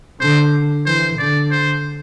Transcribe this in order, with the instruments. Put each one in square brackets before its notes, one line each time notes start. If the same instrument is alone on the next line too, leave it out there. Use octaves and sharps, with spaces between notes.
[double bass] D3 [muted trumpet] C5
[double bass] E3 [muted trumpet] C5
[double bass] D3 [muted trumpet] D5
[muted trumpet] C5